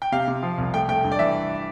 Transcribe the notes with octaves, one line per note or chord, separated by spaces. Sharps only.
G5
C3 F5
C3
F3
C2
A3 G5
A3 G5
G2
D5
E3 E5